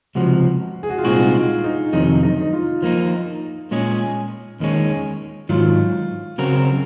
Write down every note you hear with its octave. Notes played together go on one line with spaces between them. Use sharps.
C#2 C3 F3 F#4
G#4
F#4
F4
C2 A#2 G#3 C4 D#4 F#4
F4
D#4
F2 C3 D#3 F#3 D#4
D#4
D#4
F4
F3 A#3 D#4 F4
A#2 G#3 C#4 G#4
D#2 D#3 G#3 C#4
G#2 D#3 F#3 F4
C#3 F#3 C4 F#4 A#4